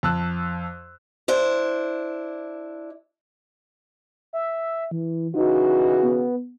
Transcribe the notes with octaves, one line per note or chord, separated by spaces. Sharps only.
F2 A5 E6 F#6
D4 E4 C5
E5
E3
C#3 E3 D#4 F#4
B3